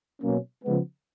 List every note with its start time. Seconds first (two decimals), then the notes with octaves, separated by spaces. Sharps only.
0.22 B2 F#3 A#3 C#4
0.63 C#3 F3 G#3 B3